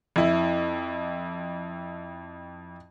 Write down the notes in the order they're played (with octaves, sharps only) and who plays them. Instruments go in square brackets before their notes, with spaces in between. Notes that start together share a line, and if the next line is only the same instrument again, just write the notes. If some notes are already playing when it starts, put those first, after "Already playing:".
[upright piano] F2 E4